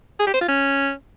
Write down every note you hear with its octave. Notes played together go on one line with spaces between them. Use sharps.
G#4
G4
C5
F4
C#4